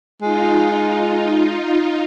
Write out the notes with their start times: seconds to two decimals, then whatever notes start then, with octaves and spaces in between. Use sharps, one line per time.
0.22 G#3 D#4 F4